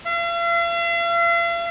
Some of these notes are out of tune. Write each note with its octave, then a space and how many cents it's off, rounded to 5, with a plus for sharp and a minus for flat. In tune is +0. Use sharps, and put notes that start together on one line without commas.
F5 -45